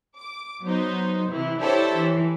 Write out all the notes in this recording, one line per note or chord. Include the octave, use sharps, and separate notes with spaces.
D6
F#3 B3 D#4 C5
C3 E3 E4
D4 E4 G4 A4 C5 C#5
E3